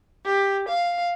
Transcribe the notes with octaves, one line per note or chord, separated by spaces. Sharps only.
G4
F5